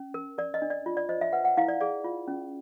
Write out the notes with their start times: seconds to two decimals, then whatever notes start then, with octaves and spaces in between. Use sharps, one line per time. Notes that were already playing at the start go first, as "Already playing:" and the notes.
Already playing: C#4
0.14 A#4
0.38 A#4 D5
0.54 D#5
0.62 D4
0.70 D5
0.86 F4
0.97 D5
1.09 C5 D#5
1.21 E5
1.32 B4 F#5
1.45 F#5
1.57 E4 F5
1.68 D5
1.80 G#4 D5
2.04 F4
2.28 C#4